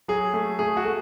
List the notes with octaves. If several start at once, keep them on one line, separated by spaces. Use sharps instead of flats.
F#3 G#4
A3
A3 G#4
F#4
A3